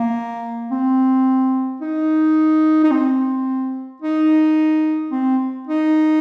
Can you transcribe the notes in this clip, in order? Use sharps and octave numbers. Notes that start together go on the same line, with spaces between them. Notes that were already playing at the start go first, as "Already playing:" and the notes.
Already playing: A#3
C4
D#4
D#4
C4
D#4
C4
D#4